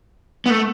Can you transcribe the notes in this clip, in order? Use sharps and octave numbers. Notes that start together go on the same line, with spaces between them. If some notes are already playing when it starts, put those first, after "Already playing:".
B3
A3